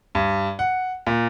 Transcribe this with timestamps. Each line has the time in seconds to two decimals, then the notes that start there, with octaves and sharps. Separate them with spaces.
0.15 G2
0.59 F#5
1.07 A#2